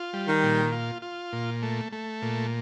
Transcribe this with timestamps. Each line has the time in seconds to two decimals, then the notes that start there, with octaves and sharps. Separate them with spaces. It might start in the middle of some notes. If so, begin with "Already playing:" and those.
Already playing: F4
0.13 G3
0.28 D#3
0.43 A#2
0.72 F4
1.02 F4
1.33 A#2
1.62 A3
1.92 A3
2.22 A#2